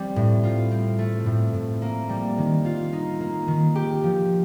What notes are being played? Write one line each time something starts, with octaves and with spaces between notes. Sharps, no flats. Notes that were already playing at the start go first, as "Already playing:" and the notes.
Already playing: G3 C4
A2
F4
C4
A3
A2
A2
A#3
G3
D#3
F4
D#4
A#3
D#3
G4
F3